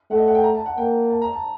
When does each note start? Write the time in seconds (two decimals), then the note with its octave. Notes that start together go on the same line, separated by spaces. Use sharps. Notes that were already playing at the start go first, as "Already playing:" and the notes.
0.10 A3 F#5
0.18 D#5
0.28 F#5
0.35 G5
0.44 A#5
0.55 A5
0.66 F#5
0.77 A#3 G5
1.10 A5
1.22 A#5
1.33 A5